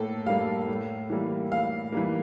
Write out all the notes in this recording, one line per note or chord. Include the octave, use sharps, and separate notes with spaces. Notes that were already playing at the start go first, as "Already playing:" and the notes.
Already playing: A2 A#3 A4
G3 A#3 F5
A2
E3 G3 A#3
A2 F5
E3 G3 A#3